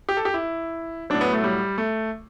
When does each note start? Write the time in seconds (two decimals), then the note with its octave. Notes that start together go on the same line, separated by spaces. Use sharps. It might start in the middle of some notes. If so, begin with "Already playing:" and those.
0.09 G4
0.17 A4
0.25 G4
0.34 E4
1.10 A2 F#3 D4
1.21 B3
1.33 A3
1.44 G3
1.78 A3